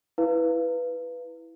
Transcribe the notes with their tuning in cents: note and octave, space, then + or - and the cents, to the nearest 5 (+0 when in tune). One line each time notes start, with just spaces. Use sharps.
E4 +0 B4 +0 F5 -25